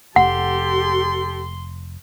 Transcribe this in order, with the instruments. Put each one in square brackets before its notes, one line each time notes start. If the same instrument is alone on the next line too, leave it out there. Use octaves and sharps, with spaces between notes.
[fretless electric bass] F1 [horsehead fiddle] G4 A4 [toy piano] F#5 [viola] C6